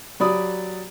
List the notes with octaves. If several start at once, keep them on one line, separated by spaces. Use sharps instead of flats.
F#3 G4 D5 B5 D#6